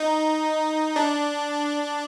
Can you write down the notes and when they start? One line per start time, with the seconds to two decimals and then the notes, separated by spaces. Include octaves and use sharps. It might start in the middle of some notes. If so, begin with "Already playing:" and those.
Already playing: D#4
0.96 D4